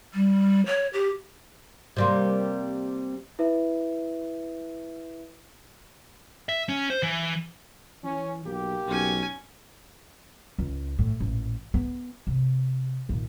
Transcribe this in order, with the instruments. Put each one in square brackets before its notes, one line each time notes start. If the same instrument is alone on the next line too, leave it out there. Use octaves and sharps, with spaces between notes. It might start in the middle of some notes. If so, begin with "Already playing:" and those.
[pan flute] G3
C#5
G4
[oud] C3 G3 A#3
[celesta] E4 B4 E5
[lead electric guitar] E5
C#4
C5
E3
[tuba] E3 [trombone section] C#4
[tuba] B1 [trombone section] A#3 G4
[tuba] B1 [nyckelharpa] C#4 G#5
[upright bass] C#2
A2
A1 A#2
B3
C3
D#2 A#2